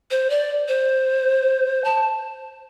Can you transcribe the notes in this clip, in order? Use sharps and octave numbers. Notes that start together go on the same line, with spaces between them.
C5
D5
C5
A5